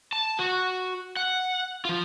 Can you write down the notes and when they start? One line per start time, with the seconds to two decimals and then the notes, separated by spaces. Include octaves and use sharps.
0.13 A5
0.39 F#4
1.16 F#5
1.85 F3 F4